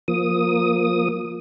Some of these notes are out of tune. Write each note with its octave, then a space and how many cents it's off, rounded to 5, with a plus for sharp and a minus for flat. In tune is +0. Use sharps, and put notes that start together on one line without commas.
F3 +10 A#3 +5 D#6 +0